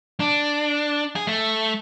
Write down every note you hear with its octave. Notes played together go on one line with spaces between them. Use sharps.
D4
G#4
A3